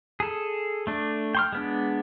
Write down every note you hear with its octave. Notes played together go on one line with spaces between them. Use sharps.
G#4 A4
A3 D4
G5 C6 F6
G#3 B3 D4